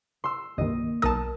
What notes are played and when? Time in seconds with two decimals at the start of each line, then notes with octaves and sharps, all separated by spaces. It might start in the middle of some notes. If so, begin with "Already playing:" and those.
0.24 C6 E6
0.58 C2 G2 D#3 A#3 D#5
1.02 B1 A#4 A5 D#6